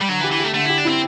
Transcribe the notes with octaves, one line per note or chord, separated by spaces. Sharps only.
G3
D3 F#3
E3
G4
E3
A3 G4
D3 A3
E4 G4
D4
C4 E4